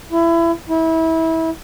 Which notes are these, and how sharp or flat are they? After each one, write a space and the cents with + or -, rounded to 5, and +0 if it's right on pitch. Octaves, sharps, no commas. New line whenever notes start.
E4 +25
E4 -25